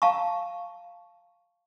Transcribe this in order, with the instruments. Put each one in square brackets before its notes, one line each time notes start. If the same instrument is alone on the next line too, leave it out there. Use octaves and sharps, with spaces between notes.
[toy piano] F5 A5 A#5 C#6